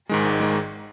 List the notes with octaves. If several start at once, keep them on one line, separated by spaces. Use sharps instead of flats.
G#2 D#3 G#3
G#1
D#3 G#3